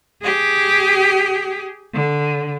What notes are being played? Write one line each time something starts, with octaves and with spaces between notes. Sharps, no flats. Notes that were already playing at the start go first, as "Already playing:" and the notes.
G4 G#4
D3